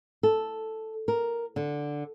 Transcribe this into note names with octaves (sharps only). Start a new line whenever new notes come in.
A4
A#4
D3